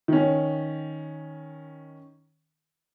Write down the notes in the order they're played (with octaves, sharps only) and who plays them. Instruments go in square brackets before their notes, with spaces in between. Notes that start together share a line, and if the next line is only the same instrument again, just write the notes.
[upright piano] D#3 C#4